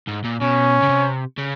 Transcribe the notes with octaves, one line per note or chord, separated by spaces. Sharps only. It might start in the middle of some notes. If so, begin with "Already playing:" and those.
G#2
A#2
B2 C#4
C#3
C3
C#3